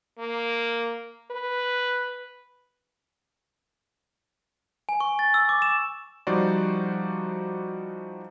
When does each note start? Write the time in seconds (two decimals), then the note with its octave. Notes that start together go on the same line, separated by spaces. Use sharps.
0.19 A#3
1.31 B4
4.89 G#5
5.01 C#6
5.19 A6
5.34 E6
5.49 D6
5.62 E7
6.27 F3 G3 D#4 F#4 C5 D5